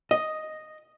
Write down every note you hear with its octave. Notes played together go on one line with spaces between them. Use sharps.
D#5